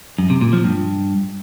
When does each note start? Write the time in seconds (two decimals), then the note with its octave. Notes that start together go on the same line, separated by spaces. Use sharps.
0.18 F#2
0.30 C3
0.41 A#2
0.53 F3
0.64 G2